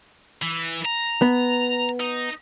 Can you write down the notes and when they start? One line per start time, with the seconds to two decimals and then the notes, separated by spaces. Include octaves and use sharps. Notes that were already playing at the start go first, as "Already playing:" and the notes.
0.42 E3
0.85 A#5
1.22 B3
2.00 D#4